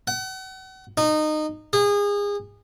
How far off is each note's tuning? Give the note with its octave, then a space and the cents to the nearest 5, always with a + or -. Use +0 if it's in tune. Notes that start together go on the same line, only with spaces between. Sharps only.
F#5 +40
D#4 -20
G#4 -30